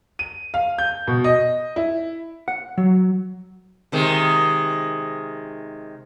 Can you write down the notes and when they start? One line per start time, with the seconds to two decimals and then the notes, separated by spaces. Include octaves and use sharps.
0.19 D#7
0.54 F5
0.78 G6
1.07 B2
1.24 D#5
1.76 E4
2.48 F#5
2.78 F#3
3.92 C3 D#3 G#3